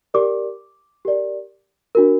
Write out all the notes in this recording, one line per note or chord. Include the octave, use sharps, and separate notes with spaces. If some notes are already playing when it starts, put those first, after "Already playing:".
G4 A#4 D5 D6
G4 A#4 D5
D4 F#4 A#4